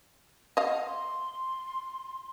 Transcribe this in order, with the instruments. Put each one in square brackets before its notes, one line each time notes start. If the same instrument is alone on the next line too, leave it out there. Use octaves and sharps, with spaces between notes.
[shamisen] D#5 F5 [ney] F#5
[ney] C6